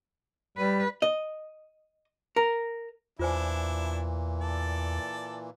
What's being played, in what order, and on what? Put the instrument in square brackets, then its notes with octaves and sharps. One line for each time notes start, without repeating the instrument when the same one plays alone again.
[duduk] G3 [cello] B4
[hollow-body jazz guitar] D#5
A#4
[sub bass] E2 [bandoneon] A#2 E3 [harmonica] D4 E4 [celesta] F4 C5 G#5
[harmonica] A4 D5